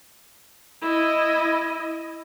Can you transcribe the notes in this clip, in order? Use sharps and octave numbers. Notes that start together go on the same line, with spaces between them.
E4 D#5